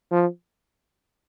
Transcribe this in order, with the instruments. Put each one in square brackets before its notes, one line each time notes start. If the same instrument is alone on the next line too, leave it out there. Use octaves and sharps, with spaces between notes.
[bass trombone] F3